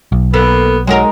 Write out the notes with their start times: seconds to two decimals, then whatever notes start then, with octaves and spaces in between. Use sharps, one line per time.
0.12 B1
0.33 A#3 B3 A4 B4
0.87 F#3 G#3 D#4 A#4